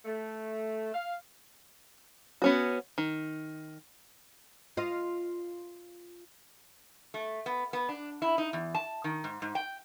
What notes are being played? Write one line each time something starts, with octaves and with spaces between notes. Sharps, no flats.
A3
F5
B3 C#4 F#4
D#3
F4 D#5
A3
B3
B3
D4
E4
D#4
E2
A5
D#3
G#2
G#2
G5